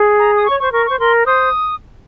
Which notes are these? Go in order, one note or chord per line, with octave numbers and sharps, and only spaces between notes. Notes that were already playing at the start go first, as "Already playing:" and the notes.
Already playing: G#4
A#5
D#6
C#5 C#6
C5 C#6
A#4 C#6
C5 C#6
A#4 C6
C5 D#6